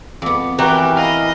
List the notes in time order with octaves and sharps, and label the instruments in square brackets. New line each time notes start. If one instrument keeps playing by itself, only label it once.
[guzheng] F2 B3 [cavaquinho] D6
[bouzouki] E3 A#4 [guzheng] F#4 [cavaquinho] G4 B4 [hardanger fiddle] G5
[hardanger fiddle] D#5 [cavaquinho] F5 B5